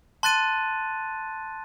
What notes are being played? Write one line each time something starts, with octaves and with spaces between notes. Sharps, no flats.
A5 C6 F#6 A6 D#7